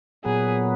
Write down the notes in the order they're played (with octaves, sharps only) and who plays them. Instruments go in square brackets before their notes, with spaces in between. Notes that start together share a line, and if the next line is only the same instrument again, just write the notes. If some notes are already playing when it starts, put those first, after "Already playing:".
[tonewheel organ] A#2 F#3 B3 [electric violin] G#4